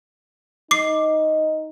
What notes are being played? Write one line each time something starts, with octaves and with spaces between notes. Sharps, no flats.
D#4 D6 C7